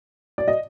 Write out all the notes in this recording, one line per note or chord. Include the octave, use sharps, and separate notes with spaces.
D5
D#5